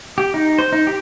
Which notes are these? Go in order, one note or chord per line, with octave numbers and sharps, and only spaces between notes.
G4
D#4
C5
D#4
G4